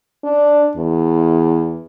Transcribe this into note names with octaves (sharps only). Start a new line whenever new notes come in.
D4
E2